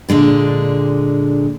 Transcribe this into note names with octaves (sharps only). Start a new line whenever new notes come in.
A#2 D3 G#3 D4